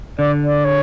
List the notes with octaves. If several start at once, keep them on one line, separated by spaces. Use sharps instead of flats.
D3 D5
D5
C#5